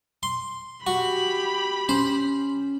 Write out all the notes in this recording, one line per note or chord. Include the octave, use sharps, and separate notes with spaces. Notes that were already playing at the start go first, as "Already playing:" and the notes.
C6
F#4 G4 B5
C#4 C5